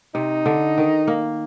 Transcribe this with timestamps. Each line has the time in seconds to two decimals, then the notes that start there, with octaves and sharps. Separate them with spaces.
0.15 C3 D#4
0.46 D3
0.78 D#3
1.08 A#3